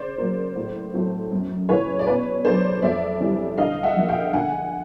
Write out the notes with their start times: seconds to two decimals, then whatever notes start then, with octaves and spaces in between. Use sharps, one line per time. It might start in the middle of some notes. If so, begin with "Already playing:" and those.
Already playing: C#3 C5 D5
0.18 F#3 A#3
0.55 A2
0.94 F#3 A3 C4
1.31 F#2
1.69 C#3 E3 A3 B4 C#5
1.99 D5
2.07 B2 B4 C#5
2.45 F#3 A3 D4 C5 D5
2.82 F2 D5 E5
3.20 C3 E3 G3
3.57 D3 D#5 F5
3.83 E5 F#5
3.96 F3 A#3
4.08 F5 G5
4.33 D3 F#5 G#5